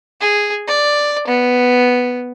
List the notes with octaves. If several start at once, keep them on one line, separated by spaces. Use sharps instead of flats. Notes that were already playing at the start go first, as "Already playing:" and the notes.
G#4
D5
B3